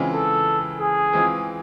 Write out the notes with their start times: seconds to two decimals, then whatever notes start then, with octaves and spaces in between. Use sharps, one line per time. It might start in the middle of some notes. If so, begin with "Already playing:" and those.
Already playing: C#3 E3 G#3 C4 F4
0.14 A4
0.79 G#4
1.13 E3 G#3 C4 F4